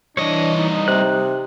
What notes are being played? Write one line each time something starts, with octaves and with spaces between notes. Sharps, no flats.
G2 E3 D4 C#5 D#5
D#4
C3 F#6